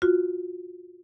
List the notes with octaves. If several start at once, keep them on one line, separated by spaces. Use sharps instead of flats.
F4 F#4